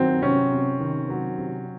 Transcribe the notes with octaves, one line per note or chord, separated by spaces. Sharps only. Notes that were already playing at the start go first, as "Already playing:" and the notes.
Already playing: D#3 F#3 C4
C3 C#4
C3
D#3
F#3
C3